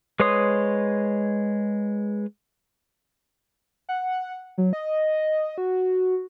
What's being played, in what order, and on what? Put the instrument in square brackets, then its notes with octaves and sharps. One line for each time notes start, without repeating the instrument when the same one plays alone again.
[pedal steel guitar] G#3 B4 C#5 C6 D#6
[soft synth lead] F#5
F#3
D#5
F#4